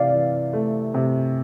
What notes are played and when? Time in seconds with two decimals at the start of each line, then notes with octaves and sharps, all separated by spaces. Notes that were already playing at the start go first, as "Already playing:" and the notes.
Already playing: C3 E3 D5 F5
0.14 E3
0.53 A3
0.94 C3